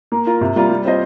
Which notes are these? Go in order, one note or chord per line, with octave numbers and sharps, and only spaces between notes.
A#3
F4 A#4
C3
G3 A#3 F4
G3
C4 F4 C5 D#5